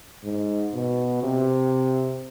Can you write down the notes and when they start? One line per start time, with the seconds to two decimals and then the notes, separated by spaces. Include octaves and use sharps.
0.24 G#2
0.74 B2
1.23 C3